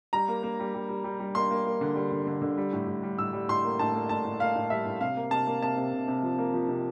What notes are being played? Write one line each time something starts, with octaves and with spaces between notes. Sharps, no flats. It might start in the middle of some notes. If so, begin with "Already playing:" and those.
G3 A#5
A#3
A#3
G3
G3
G3
G3
G3
A#3 C6
A#3
A#3
D3
G3
D3
D3
D3
G3
A2
A2
G3
A2 E6
G3
A2 C6
A#3
A2 A5
A#3
A2 A5
A2
A#3 F5
A2
G3 E5
A2
C3 F5
A#3
C3 A5
A#3
C3 A5
C3
C3
C3
F3
A#3
F3
C3